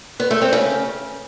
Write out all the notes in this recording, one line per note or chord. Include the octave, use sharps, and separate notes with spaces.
B3
A3
C4
C#3